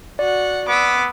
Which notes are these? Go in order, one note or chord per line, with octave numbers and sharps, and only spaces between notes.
F#4 D5 F#5
B3 D6 E6